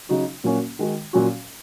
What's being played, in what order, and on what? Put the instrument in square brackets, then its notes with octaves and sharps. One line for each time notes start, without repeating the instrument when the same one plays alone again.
[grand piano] C#3 F#3 D#4 F#4
A#2 F#3 A#3 C#4 F#4
D#3 G#3 F#4
A#2 F#3 C#4 F#4